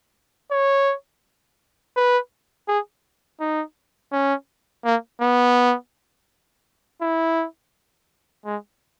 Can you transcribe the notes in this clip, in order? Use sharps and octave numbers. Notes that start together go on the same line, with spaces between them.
C#5
B4
G#4
D#4
C#4
A#3
B3
E4
G#3